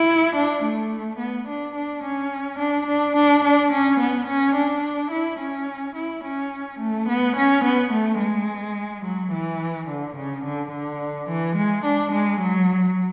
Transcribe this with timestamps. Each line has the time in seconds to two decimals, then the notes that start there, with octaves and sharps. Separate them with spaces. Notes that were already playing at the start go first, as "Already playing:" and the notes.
Already playing: E4
0.36 D4
0.63 A3
1.20 B3
1.48 D4
1.75 D4
2.04 C#4
2.59 D4
2.87 D4
3.16 D4
3.44 D4
3.72 C#4
4.00 B3
4.28 C#4
4.55 D4
5.11 E4
5.40 C#4
5.96 E4
6.24 C#4
6.80 A3
7.09 B3
7.37 C#4
7.64 B3
7.92 A3
8.20 G#3
9.05 F#3
9.33 E3
9.88 D3
10.17 C#3
10.45 D3
10.72 D3
11.29 E3
11.56 G#3
11.85 D4
12.12 G#3
12.41 F#3